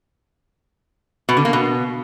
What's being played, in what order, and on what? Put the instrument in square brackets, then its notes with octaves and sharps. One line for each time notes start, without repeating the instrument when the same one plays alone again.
[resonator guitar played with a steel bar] B2
D3
A#3
B2